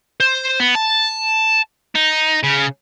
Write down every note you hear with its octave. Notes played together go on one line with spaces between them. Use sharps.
C5
B3
A5
D#4
C#3